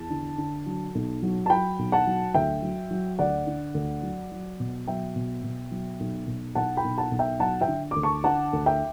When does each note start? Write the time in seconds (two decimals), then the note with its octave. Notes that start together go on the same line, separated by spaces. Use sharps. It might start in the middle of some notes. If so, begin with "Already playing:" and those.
Already playing: E2 A5
0.10 D3
0.38 D3
0.66 F#3
0.95 B1
1.22 F#3
1.46 A5
1.50 F#3 G5 B5
1.79 B1
1.92 F#5 A5
2.07 F#3
2.34 D2 E5 G5
2.62 F#3
2.91 F#3
3.19 D2 D5 F#5
3.47 D3
3.74 D2
4.03 F#3
4.32 F#3
4.60 B2
4.87 F#3 E5 G5
5.16 B2
5.44 B2
5.71 F#3
6.00 B1
6.27 B1
6.55 B1 F#5 A5
6.77 G5 B5
6.84 B1
6.98 F#5 A5
7.11 B1
7.19 E5 G5
7.40 F#3 F#5 A5
7.61 E5 G5
7.68 D3
7.91 D2 D6
8.03 A5 C#6
8.24 D3 F#5 A5
8.53 D2
8.66 E5 G5